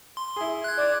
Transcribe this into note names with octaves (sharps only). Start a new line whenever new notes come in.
C6
E4 G#4
F#6 G#6
D5